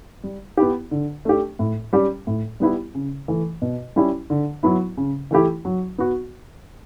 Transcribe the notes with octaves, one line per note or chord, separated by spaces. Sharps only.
G3
B3 E4 G4
D3
A3 D4 G4
A2
G3 C#4 G4
A2
G3 B3 E4 G4
C#3
E3 A3
B2
G3 C#4 E4 G4
D3
F#3 B3 E4
C#3
E3 A3 E4 G4
F#3
B3 F#4